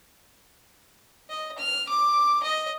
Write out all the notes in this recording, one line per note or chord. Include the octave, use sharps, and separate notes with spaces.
D#5
F6
D6
D#5